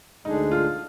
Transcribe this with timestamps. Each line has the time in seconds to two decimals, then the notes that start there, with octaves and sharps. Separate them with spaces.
0.24 D2 D3 G#3 D4 D#4 G#4
0.51 F4